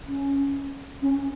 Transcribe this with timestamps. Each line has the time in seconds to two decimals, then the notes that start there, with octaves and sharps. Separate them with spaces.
0.07 C#4
1.02 C#4